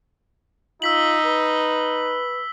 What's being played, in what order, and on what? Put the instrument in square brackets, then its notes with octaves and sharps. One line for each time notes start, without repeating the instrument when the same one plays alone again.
[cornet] D#4 [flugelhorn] F4 [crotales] E6 B6 F#7
[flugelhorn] B4